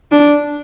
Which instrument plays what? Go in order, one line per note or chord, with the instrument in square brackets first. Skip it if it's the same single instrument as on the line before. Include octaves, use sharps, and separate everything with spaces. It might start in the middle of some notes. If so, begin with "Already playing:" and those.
[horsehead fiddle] D4